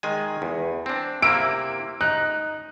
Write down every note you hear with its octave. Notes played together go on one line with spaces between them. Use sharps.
D#3 G#3 G#5
E2
C4 D4
C3 A#3 E4 E6 D7
D#4 F#6